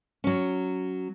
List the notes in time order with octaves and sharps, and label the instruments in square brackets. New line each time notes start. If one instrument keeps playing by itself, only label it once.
[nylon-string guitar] F#3 C#4